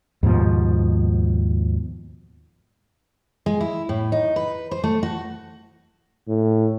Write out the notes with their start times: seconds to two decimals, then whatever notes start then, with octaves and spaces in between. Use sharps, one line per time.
0.23 D#2 G#2 B2 F3
3.46 G#3
3.61 E4
3.89 A2
4.12 D#4
4.36 B4
4.71 C5
4.83 A3
5.03 F#4
6.28 A2